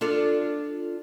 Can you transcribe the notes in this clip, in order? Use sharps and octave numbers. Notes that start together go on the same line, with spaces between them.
D4 F4 A4